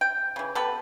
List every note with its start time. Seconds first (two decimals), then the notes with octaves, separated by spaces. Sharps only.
0.01 G5
0.36 C#3 E3
0.55 B3 G4 A4 B4